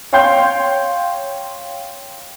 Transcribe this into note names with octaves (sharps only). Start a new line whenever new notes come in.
C#5 F5 G5 C6 G6